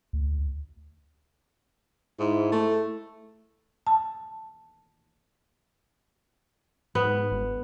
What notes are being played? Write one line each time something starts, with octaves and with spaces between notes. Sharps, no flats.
D2
G#2 E4
A3
A5
G#2 B3
G1